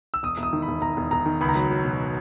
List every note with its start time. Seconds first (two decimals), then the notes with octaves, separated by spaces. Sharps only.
0.14 E6
0.23 E1 D#6
0.37 E1
0.43 D#6
0.53 D#3
0.62 B5
0.68 E1
0.82 E1 A#5
0.97 E1
1.11 E1 A#5
1.26 D#3
1.41 C#2 B5
1.49 A#5
1.55 F#3 B5
1.71 F#3
1.85 B2